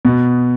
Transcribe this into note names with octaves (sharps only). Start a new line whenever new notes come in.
B2 B3